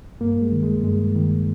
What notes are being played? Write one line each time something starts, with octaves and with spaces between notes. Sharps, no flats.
G2 A#3
G#3
D#3
G#3
G2 G#3
D#3